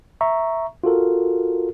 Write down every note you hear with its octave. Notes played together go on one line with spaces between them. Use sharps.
E5 A#5 C#6
F4 F#4 A4 A#4